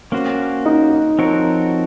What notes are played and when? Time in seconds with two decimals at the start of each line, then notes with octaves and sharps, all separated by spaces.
0.12 A#3 C#4 F#4 C5
0.66 D#4
1.19 F3 C4 F#4 A#4 C#5